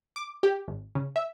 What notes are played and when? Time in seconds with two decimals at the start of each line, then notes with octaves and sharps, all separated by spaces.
0.16 D6
0.43 G4
0.68 G#1
0.95 C#3
1.16 E5